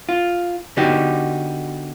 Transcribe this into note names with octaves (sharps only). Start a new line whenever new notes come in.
F4
D3 B3 D#4 F#4 G4